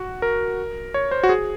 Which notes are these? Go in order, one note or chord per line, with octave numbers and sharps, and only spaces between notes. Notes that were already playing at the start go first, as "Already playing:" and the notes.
Already playing: F#4
A#4
C#5
C5
F#4
G#4